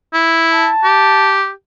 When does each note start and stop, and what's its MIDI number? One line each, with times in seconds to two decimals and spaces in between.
0.13 0.69 64
0.54 1.41 81
0.84 1.50 67